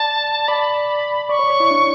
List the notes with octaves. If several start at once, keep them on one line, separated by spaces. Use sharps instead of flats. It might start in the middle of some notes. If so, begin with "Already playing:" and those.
Already playing: D5 A5
A5
D5 B5
D5 C#6
C#5
C#5
E4
D4